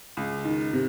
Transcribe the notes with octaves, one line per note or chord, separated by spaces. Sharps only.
C#2
D#3
C3